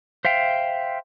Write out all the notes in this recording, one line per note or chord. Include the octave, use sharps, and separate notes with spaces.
C5 E5 F5 G5